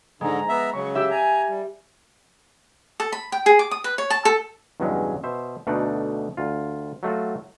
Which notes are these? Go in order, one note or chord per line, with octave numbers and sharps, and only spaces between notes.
G#2 D3 G#3 A#5
B3 E5
C#3 F#3 C#6
G4 E5 E6
G#5 A#5
G3
A4
B5
G5
G#4
D6
D#6
B4
C#5
A5
A4
E2 G2 C#3 F#3 G#3 C#4
B2 C5 E5
D2 B2 A3 D4 D#4 F#5
D2 F4
F#3 A3 F4 F#4